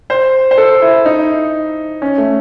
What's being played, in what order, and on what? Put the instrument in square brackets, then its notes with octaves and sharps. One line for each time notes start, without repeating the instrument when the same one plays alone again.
[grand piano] C5
C5
A4
E4
D#4
C#4
A3